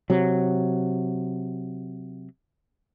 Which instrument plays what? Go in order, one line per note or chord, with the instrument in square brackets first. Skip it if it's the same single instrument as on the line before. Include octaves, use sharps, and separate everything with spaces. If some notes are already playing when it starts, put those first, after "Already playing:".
[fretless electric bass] C3 F#3